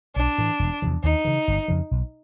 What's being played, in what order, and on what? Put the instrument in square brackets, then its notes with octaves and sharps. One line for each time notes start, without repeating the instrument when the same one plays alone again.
[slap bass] B1 [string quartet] D4
[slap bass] A2 E3
E1
E2 C3 F3
[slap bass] D#2 [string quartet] D#4
[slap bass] C#3 E3
G1
F2 C#3 F3
B1